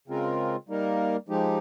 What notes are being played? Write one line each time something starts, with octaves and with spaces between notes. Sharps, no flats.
C#3 G#3 C4 F4 A#4
G3 A#3 D#4 A#4
F3 G#3 D#4 G4